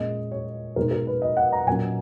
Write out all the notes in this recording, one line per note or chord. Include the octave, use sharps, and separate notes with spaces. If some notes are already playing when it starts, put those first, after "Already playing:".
Already playing: A#2 G#3 C#4 D#5
C#5
B2 G#3 D#4 A#4
A#4
B4
D#5
F#5
A#5
A#2 F#3 C#4 G#5